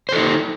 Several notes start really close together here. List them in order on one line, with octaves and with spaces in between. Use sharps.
C5 A4 D#4